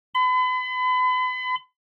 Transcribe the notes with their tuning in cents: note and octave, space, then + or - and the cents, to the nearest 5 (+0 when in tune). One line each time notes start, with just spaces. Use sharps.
B5 +40